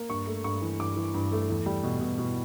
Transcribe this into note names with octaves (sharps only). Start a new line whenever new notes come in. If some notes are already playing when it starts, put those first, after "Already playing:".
Already playing: A#3
G2 C#6
A3
G2 C#6
E3
G2 D6
E3
G2
A3
E2
G3
B2
B2
B2